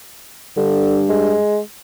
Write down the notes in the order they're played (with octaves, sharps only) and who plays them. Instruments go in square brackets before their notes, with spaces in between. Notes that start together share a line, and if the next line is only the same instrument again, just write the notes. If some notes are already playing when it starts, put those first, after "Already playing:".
[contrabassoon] G2 [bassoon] D3
[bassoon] G#3